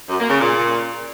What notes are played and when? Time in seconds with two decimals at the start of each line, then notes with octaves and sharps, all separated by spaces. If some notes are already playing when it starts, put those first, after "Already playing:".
0.09 F#2
0.19 A#3
0.30 C#3
0.40 A#2